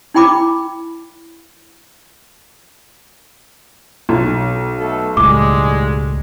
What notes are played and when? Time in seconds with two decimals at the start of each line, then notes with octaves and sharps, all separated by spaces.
0.15 D#4 E4 G5 B5 D6
4.09 B1
4.79 B2 A3 A4
5.17 C#2 A2 G3 G#3 D6